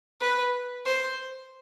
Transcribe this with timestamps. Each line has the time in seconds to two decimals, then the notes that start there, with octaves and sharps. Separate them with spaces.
0.20 B4
0.85 C5